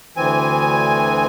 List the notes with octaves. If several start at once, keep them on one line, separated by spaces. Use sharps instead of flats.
D2 E3 C4 G#5